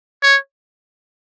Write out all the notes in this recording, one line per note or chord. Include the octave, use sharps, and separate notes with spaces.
C#5